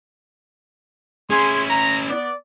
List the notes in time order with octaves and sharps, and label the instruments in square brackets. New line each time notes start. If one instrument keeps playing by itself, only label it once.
[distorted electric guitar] C#4 E4 [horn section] G#4 G#5 C6
[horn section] A#5
B3 D5